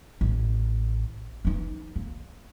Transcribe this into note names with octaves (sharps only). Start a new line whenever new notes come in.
A1
E3 D#4
A#3